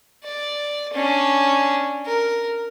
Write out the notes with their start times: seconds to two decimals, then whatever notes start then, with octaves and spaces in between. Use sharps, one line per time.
0.24 D5
0.93 C#4 D4
2.06 A#4